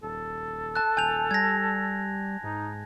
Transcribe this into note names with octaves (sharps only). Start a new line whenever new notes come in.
D#1 A4
A5 F#6
D#1 G#5 G6 F7
G3 G#6 A#6
G#2 D#4